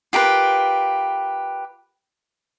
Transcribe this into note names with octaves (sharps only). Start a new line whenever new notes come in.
F4 G4 A#4 B4